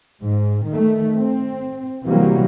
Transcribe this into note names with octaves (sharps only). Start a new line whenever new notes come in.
G#2
D#3 A3
C4
C3 E3 F#3 G3 A#3